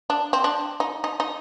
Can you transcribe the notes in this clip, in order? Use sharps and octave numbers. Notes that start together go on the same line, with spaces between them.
D4
C4
D4
D#4
D#4
D#4